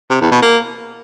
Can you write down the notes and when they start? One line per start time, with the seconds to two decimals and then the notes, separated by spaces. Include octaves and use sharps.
0.10 C3
0.21 E2
0.31 B2
0.42 A#3